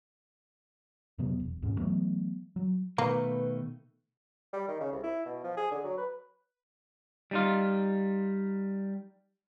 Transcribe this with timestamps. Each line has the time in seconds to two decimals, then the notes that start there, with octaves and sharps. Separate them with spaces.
1.18 F2 C3 F#3 B3
1.40 E1
1.62 D#1 D#2 G#2 C#4
1.78 E3 F#3 A3 B3
2.56 F#3
2.98 B2 D#3 A3 A#3 B4
4.53 G3
4.68 D#3
4.80 C#3
4.92 C2
5.04 E4
5.26 B2
5.44 F3
5.57 G#4
5.72 D3
5.84 F#3
5.98 B4
7.31 G3 D#4 F4